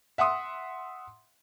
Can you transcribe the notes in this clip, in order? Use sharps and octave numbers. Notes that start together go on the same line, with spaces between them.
E5 F#5 C6 D#6